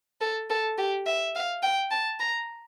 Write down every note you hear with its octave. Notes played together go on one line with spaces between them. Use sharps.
A4
A4
G4
E5
F5
G5
A5
A#5